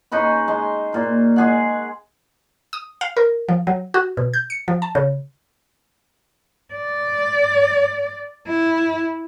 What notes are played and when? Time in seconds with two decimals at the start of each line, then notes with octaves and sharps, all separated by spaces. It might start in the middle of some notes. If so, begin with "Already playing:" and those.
0.12 C#3 D#4 B4 C6
0.48 G#3 C6
0.93 A#2 C5
1.36 G#3 G#4 F#5
2.73 D#6
3.01 F5
3.17 A#4
3.49 F3
3.67 F#3
3.94 F#4
4.17 B2
4.33 G6
4.50 C#7
4.68 F3
4.82 A5
4.95 C#3
6.74 D5
8.48 E4